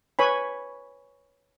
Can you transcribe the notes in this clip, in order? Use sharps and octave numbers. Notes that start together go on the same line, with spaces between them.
B4 C#5 G#5 B5